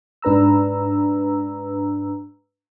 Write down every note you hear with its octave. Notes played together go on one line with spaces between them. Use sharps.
G#2 D4 B4 A#5 E6